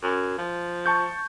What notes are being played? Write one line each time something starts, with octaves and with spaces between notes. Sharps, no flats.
F#2
F3
A5 C#6 G6